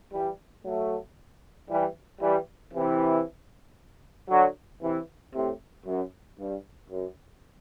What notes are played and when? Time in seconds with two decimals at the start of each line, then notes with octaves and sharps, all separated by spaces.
0.12 E3 G3
0.65 F#3 A3
1.69 E3 G3
2.21 E3 G3
2.74 C3 E3
4.29 D3 F#3
4.81 C3 E3
5.34 A2 C3
5.86 F#2
6.38 G2
6.90 F#2